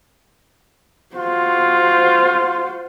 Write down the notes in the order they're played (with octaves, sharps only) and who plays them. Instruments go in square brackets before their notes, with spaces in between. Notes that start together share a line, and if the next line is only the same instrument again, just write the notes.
[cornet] F4 [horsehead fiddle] F#4 C5